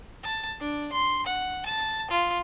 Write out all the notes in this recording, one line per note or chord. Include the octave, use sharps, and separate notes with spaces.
A5
D4
C6
F#5
A5
F4